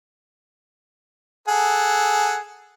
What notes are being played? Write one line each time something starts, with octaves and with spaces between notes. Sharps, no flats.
G#4 A4 F#5